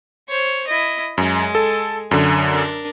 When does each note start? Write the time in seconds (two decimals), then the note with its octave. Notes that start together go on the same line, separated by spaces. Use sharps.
0.29 C5 C#5
0.68 E4 D#5
1.18 F#2 G#3
1.55 A4
2.11 F#2 D3 G#5
2.50 D4 A#4